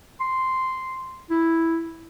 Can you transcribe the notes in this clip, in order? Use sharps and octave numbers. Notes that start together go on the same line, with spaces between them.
C6
E4